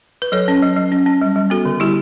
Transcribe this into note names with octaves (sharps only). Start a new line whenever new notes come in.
B4
F#3 A4 C#5
C#4
F#3
F#3
C#4
C#4
G3
G3
B3 F#4 A4
D3
G3 E4 G4